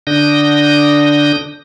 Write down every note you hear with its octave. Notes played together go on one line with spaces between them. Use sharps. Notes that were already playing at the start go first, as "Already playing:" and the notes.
D3 D4 D#6 G6 A#6